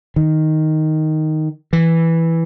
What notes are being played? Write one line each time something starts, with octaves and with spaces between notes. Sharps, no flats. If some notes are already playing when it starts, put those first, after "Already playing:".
D#3
E3